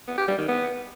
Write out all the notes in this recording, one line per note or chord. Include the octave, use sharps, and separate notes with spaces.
B3
G4
G3
D#3
B3